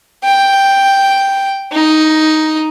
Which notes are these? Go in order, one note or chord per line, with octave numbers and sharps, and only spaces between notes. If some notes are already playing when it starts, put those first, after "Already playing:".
G5
D#4